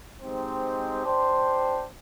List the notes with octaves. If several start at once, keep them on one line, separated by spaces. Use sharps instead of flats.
G#3 C4 D#4 G4 C5
D4 G4 C5